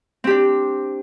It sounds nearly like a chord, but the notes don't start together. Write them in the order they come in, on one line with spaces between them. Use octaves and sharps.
C4 G4 D4